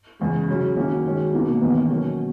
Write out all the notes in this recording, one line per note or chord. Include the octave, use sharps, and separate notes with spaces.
E2 C#3 G#3
C#3 F#3 C#4 F#4
D#3 A#3 C#4 E4 F#4
C#4
D#3 G#3 C#4 F#4
B2 A#3 B3 D#4 F#4
A#3
E2 D#3 A#3 B3 C#4
B2 F#3 C#4 F#4